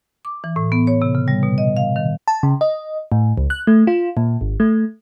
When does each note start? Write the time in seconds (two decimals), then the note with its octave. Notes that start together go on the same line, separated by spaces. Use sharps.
0.25 D6
0.44 E3
0.56 A2
0.72 B3
0.87 C#5
1.02 C3
1.15 C#3
1.28 G3
1.43 B2
1.58 D#5
1.77 F5
1.96 D#3
2.28 A5
2.43 C#3
2.61 D#5
3.12 A2
3.38 C#2
3.50 F#6
3.67 A3
3.87 F4
4.17 A#2
4.41 G#1
4.60 A3